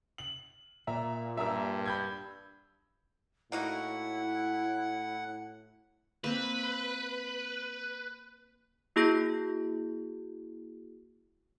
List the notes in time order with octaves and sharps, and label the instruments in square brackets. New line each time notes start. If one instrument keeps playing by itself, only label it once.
[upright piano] F#7
[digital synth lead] A#2 [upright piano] E5 A#5
[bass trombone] G2 [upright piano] E5 A#5 E6
[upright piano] B5 G6 G#6
[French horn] A2 [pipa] A#3 D#4 F#4 [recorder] E4 [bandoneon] F#5
[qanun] A#3 C4 [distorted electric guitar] B4
[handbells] A#3 E4 F#4 G#4 G6 A#6